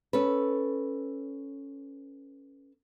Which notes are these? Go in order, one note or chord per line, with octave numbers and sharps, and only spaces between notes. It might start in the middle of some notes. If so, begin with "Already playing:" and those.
C#4 A4 B4